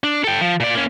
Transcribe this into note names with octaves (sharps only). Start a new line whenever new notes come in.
D4
A4 G5
F3
A#2 D5
A#3 C#4